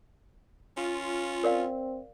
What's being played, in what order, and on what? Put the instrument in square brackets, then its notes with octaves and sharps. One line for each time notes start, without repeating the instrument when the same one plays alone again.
[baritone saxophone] C#4 [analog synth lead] F4
[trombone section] C4 [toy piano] A#4 D5 F5